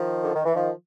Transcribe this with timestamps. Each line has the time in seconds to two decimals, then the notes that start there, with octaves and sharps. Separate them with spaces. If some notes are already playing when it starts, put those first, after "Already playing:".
Already playing: D#3 F3
0.23 D3
0.35 D#3
0.45 E3
0.55 D#3 F3